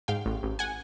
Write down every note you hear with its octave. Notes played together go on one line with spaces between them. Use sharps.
G#2 F5 G5
A1
A1
F#5 G#5